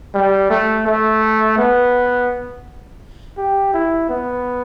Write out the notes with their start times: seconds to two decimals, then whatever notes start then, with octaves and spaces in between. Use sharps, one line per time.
0.14 G3
0.50 A3
0.86 A3
1.58 B3
3.37 G4
3.74 E4
4.09 B3